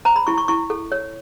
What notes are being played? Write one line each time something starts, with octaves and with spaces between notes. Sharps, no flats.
C5 A#5
B5
E4 C#6
C#6
E4 C#6
A4
C#5